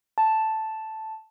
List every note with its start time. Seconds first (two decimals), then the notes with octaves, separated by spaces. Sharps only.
0.18 A5